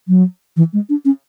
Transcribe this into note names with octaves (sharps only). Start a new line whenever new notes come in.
F#3
E3
G#3
D4
C#4